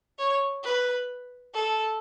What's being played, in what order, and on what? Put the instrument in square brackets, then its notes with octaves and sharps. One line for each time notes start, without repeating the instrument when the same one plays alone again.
[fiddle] C#5
B4
A4